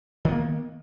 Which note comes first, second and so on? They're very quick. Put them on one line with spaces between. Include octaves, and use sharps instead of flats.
D#3 B3 A#3